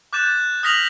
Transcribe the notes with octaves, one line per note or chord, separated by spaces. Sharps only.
D6 F#6 G6 A6 E7
D#6 F6 A#6 B6 F7 F#7